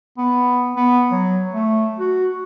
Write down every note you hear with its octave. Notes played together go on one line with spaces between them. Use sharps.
B3
B3
F#3
A3
F#4